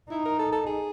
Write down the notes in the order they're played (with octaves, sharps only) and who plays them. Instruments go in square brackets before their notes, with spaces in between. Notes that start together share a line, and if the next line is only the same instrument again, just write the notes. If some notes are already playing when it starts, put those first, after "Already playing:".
[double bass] D#4 [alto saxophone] E4
[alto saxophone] A#4
A4
A4
G#4